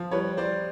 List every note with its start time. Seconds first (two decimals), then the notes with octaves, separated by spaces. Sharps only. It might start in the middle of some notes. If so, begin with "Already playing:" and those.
Already playing: F3
0.11 G3 B4 C#5
0.37 G3 C5 D5